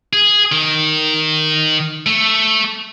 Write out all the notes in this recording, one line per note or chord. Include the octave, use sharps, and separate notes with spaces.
G#4
D#3
A3